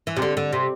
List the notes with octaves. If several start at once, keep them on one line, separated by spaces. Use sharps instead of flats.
E3
C3
D3
D3
C3